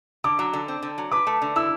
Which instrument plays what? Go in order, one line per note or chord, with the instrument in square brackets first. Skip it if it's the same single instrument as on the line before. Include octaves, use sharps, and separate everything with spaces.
[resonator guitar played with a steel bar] D3 [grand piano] D6
[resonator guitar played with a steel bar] F#3
D3
C4
D3
F#3
[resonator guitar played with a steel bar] B4 [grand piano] D6
[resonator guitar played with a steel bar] A3
D3
[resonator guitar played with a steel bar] E4 [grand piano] E6